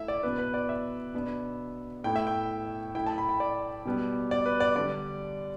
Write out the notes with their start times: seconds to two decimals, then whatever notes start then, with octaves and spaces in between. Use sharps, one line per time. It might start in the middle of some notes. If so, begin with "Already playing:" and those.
Already playing: A3 E4 E5
0.08 D5
0.23 B2 B3 E4 B4
0.38 B4
0.54 D5
0.69 E5
1.14 B2 B3 D4
2.04 A2 A3 E4 G5
2.16 E5
2.27 G5
2.95 A2 A3 E4 G5
3.06 A5
3.18 B5
3.29 G5
3.40 D5
3.85 B2 G3 B3
4.31 D5
4.46 B4
4.60 D5
4.75 D3 G3 D4 D5